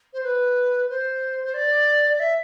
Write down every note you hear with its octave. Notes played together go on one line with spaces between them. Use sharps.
C5
B4
C5
C5
D5
D5
E5